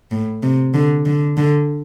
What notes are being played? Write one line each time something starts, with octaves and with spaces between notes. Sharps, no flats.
A2
C3
D3
D3
D3